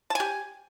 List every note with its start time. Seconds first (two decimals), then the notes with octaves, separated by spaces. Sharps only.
0.10 A5
0.15 G#5
0.20 G4